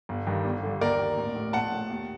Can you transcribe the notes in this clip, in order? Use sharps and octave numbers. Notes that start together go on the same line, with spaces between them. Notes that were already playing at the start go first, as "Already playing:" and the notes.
G1
G2 D#3
G1
G2 D3
D#2 A#4 D5
D#3
A1
A2
A#1 F#5 A5
A2
D#2